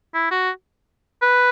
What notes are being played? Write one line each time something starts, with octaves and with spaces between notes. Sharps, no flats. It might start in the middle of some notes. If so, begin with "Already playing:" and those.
E4
F#4
B4